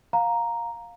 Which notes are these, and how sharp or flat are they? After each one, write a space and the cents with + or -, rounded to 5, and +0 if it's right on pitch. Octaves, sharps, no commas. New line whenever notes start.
F5 +15 A#5 +0